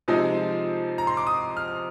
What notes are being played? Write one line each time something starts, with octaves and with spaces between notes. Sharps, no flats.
C3 F3 G#3 C4 D#4
A#5
C6
D6
D#6
F6